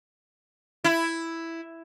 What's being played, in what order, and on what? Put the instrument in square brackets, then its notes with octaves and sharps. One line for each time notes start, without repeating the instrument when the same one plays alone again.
[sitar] E4